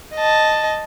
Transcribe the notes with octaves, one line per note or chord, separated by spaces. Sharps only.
D#5 A5